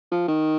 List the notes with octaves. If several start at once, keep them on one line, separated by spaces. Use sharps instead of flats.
F3
D#3